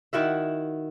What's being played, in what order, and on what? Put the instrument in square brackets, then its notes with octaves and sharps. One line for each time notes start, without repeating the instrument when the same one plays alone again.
[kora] D#3 E4 F#4 E5